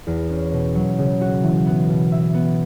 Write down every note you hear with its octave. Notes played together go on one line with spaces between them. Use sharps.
E2
C#4
B2
F#3
C#3
F#4
E3
B3
B2
E5
B3